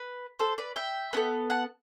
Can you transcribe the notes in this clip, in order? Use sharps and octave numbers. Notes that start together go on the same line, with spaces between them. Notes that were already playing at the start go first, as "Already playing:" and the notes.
Already playing: B4
A4 C5
B4 D5
E5 G5
B3 D4 A4
F#5 A5